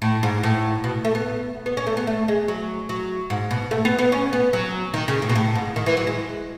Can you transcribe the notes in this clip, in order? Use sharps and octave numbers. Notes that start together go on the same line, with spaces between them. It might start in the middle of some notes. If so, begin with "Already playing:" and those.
A2
G#2
A2
B2
A3
B3
B3
C#4
A3
B3
A3
G#3
F#3
F#3
G#2
B2
A3
B3
B3
C#4
B3
F#3
D#3
C#3
A2
B2
A2
G#2
D#3
E3
F#3
G#3